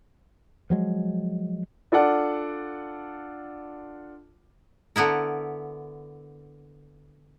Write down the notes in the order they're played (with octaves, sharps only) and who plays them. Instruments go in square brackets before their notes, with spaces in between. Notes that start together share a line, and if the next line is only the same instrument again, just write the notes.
[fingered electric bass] F3 F#3 G#3
[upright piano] D4 F4 A4 D5 F#5 A5
[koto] D3 B3 E4 A#4